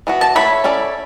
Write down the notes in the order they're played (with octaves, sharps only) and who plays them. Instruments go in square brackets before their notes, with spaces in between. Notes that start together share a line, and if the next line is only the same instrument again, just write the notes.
[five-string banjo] E3 B3 F#4
[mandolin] A5
[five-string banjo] A3 E4 A4 C#5 [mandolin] B5
[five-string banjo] C#4 E4 A4 D5